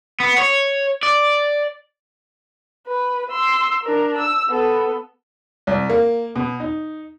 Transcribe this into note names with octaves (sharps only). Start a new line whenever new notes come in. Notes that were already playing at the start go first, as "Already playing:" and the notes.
B3
C#5
D5
B4
C6 E6
D4 A#4
E6
B3 A4
C2
A#3
B2
D#4